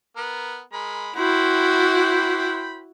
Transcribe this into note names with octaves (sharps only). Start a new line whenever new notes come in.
B3 A#4
G#3 A#4 B5
E4 F#4 C5 G5 B5